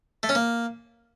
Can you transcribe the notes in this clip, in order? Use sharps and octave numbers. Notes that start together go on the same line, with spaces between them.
A3
C#4
A#3